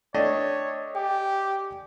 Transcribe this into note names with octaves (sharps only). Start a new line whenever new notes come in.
A3 D4 C#5 D#5 G5 A5 A6
G4 G5 G#5